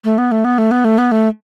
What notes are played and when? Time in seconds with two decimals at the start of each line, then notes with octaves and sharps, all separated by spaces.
0.04 A3
0.18 B3
0.31 A3
0.44 B3
0.58 A3
0.71 B3
0.84 A3
0.98 B3
1.11 A3